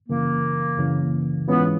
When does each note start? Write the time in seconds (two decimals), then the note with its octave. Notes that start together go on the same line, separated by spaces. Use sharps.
0.09 F#2 C#3 E3 A#3
0.78 F#2 C#3 E3
1.48 G#2 E3 G#3 B3 C#4 F4